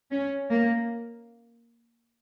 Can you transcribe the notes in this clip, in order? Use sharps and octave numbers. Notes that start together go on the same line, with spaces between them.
C#4
A#3